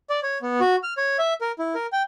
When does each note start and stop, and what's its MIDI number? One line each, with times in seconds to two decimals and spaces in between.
0.10 0.20 74
0.23 0.38 73
0.42 0.60 59
0.60 0.76 66
0.83 0.94 89
0.97 1.17 73
1.19 1.34 76
1.41 1.52 70
1.59 1.74 64
1.75 1.86 70
1.93 2.03 79